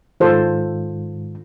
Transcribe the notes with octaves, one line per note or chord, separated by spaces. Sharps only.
G#2 D#3 F4 A4 C5